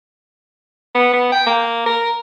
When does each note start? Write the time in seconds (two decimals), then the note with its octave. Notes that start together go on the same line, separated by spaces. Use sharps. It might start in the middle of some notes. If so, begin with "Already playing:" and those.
0.95 B3
1.13 B3
1.32 G5
1.47 A#3
1.86 A#4